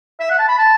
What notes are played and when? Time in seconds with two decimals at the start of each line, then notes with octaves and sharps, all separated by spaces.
0.20 E5
0.30 F#5
0.39 A5
0.48 B5
0.58 A5